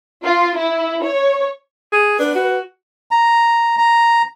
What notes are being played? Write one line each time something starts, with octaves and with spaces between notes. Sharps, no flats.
F4
E4
C#5
G#4
D4 B4
F#4
A#5
A#5